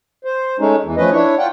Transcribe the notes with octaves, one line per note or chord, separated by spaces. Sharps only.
C5
G#3 A3 C#4 D#4
E2 E3
F3 A3 C#4 B4 D#5
D4 E4 C#5
F4 F#5 G5